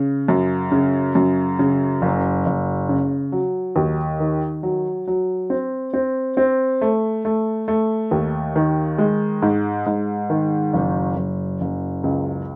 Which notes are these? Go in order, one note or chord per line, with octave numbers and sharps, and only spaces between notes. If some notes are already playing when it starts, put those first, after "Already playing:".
Already playing: C#3
F#2
C#3
F#2
C#3
F#1
F#1
C#3
F#3
D#2
D#3
F#3
F#3
C4
C4
C4
A3
A3
A3
D#2
D#3
G#3
G#2
G#2
D#3
F#1
F#1
F#1
C#2